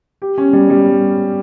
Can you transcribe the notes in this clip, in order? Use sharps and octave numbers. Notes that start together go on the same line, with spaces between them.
G4
C#4
G3
G3